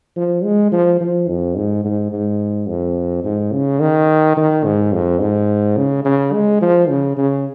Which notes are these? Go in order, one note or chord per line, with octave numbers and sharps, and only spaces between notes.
F3
G#3
F3
F3
F2
G#2
G#2
G#2
F2
G#2
C#3
D#3
D#3
G#2
F2
G#2
C#3
C#3
G#3
F3
C#3
C#3